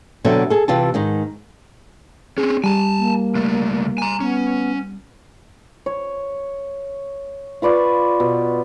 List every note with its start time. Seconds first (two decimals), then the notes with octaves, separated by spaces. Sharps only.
0.25 B2 D3 F#3 C4 A4 E5
0.50 G#4 A4
0.68 C3 E3 F4 G4 A5
0.94 G#2 D#3 D#4
2.38 C4 C#4 G#4
2.64 G3 G#5 A5
2.99 A#3
3.35 C#2 A3
3.98 G#5 A#5
4.20 B3 C#4
5.86 C#5
7.62 F4 B4 D5 C#6
8.20 B2